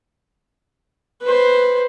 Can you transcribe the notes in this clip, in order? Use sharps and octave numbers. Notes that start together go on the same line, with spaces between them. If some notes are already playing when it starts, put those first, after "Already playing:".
B4 C5